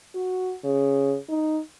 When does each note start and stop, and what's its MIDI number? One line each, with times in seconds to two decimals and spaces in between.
0.15 0.55 66
0.64 1.16 49
1.29 1.60 63